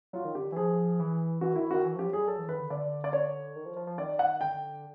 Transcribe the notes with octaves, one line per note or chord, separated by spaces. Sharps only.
F#3 F4
D#3
D3 G4
E3
F3 G#4
E3
E3 F#4
D#3 E4
D#3 F#4
E3
F3 G4
F#3
G3 G#4
F#3 A4
E3
D#3 B4
D3
D3 D5
D5
C#5
D#3
F3
F3
F3
D#3 D5
F#5
D3 G5